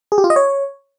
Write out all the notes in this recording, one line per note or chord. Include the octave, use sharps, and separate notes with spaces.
G#4
G4
F4
D#5
C#5